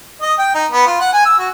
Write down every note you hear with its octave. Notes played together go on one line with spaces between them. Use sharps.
D#5
G5
D#4
B3
F4
F#5
G#5
E6
F#4